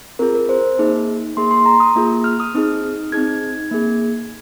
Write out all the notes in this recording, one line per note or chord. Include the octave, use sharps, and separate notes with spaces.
C4 F4 G#4 A#4
A#4
C5
A#3 D#4 G#4
A#3 G#4 C6
C6
A#5
D#6
A#3 F4 G#4
F6
D#6
C4 D#4 G#4
C4 D#4 G#4 G#6
A#3 G#4